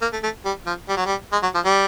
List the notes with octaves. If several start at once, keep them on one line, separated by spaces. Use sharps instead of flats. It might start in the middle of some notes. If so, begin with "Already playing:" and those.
A#3
A3
A3
G3
F3
G3
F#3
G3
G#3
F#3
F3
G3